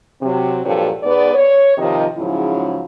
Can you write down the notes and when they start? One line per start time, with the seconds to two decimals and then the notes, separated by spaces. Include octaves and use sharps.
0.21 C3 F#3 C4
0.65 G2 A#2 F3 F#3 A4 C#5
1.03 G#2 B3 D5
1.35 C#5
1.77 C3 D#3 F3 G3 D#5
2.17 G#2 C#3 F3 F#3 C#4 E4